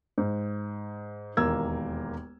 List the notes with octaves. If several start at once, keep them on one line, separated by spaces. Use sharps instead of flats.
G#2
E1 D#2 A#3 E6 G#6